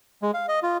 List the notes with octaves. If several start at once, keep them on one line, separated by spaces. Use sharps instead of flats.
G#3
F5
D#5
F4